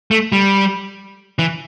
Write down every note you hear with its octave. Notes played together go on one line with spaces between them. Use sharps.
A3
G3
E3